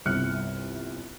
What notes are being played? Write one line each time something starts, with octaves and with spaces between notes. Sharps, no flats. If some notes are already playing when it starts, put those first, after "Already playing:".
G1 C2 F6 F#6 C#7